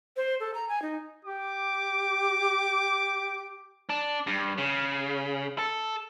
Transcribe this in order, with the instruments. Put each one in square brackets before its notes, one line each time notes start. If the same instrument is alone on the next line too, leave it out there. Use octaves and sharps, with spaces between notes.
[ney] C5
A4
A#5
G#5
D#4
[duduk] G4 [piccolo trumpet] D6
[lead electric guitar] D4
G2
C#3
A4